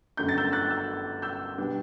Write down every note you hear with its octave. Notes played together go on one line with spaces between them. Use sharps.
G1 F#2 D3 A3 D4 G6
A6
E6 G6
F#6 A6
F#6
E6 G6
E6 G6
B2 G3 B3 D4